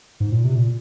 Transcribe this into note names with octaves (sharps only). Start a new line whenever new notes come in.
G#2
A#2
C3
A#2